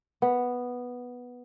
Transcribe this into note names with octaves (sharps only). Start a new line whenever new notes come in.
B3